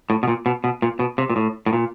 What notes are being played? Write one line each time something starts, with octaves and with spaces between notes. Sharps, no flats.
A2
B2
A#2
B2
B2
A#2
B2
C3
A#2
A2
A2
A#2